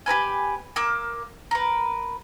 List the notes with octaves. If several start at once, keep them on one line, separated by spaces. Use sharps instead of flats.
G4 A#4 B4 G#5
A#3 A#4 D6 E6
A#4 B4